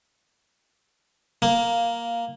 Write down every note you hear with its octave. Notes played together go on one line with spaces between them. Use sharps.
A#3